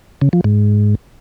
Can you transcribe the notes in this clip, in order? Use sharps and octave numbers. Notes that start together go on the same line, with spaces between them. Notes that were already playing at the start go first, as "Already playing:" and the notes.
C#3
F3
G#2